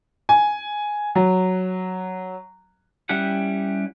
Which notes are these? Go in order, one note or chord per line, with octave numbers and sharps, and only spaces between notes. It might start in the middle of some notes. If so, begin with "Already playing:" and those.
G#5
F#3
G3 C#4 E4 G4 F#5